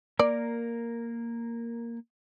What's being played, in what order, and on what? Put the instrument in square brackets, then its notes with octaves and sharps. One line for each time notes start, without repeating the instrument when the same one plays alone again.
[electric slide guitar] A#3 A#4 [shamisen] D5